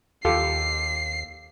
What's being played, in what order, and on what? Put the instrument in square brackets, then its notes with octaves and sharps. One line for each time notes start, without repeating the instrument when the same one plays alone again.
[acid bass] D#2 [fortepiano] F4 G4 A4 [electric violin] C7